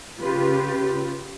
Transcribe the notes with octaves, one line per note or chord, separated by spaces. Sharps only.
C#3 F4 G4 B4